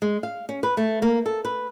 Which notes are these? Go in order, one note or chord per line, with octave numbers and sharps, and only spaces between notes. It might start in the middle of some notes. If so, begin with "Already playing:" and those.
G#3
F5
C#4
B4
A3
A#3
A4
B4